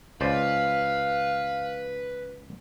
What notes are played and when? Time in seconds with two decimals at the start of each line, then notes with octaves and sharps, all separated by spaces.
0.21 C#2 B4 C5 D5 F5